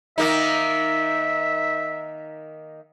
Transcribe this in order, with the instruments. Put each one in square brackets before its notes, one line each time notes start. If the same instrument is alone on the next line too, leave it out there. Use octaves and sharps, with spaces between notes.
[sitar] D#3 A#3 D#4 [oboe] E5